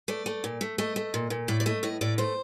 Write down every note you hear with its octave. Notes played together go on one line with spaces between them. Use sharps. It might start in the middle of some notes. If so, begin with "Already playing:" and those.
A3 D5
A3
A#2
A3
A3 D#5
A3
A#2
A#2
A2 D5
D5
A3 D#5
A2 D#5
A2 D5
A3 C5